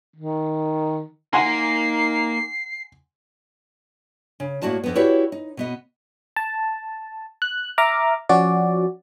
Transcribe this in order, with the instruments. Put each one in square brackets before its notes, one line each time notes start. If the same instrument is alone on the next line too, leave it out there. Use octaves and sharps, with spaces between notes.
[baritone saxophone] D#3
[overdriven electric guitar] A#3 [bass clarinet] D#4 [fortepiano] F#5 G#5 C6 [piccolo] C7
[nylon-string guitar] C#3
A2 A#3 F#4 D5 A5
F2 B3
E4 F#4 G4 B4 C#5 D5
D#4
B2 B3 D#5
[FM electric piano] A5
F#6
E5 A#5 D6 F6
F3 C#4 F#4 D5